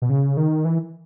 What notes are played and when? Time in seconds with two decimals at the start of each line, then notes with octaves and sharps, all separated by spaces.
0.02 B2
0.10 C#3
0.37 D#3
0.65 E3